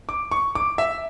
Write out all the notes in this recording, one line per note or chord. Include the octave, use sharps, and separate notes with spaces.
D6
C#6
D6
E5